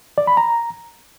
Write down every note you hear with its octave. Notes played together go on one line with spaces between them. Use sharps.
D5
B5
A#5